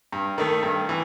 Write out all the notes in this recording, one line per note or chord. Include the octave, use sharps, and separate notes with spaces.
G2
D#3 A3
G2
E3